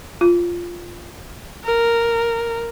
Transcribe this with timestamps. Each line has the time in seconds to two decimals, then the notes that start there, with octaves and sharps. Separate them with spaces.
0.21 F4
1.64 A#4